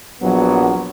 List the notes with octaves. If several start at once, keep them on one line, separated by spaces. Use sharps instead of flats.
A#1 F#3 B3